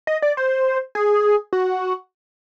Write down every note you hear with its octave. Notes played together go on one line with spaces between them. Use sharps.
D#5
D5
C5
G#4
F#4